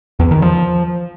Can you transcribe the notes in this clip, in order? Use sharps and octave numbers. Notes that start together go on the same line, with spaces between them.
E2
D#3
F3